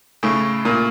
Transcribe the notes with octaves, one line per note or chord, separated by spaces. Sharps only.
A2 C#3
A#2